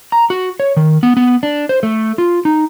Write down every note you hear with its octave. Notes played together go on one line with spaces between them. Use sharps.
A#5
F#4
C#5
D#3
B3
B3
D4
C5
A3
F4
D#4